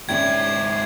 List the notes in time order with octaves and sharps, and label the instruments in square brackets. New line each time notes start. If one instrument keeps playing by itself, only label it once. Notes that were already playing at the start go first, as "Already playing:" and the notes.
[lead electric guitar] G#2 E4 [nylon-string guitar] C#4 D5 G5 [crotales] G#6